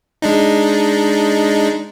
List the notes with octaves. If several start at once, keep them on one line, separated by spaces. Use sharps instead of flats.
G#3 D4 D#4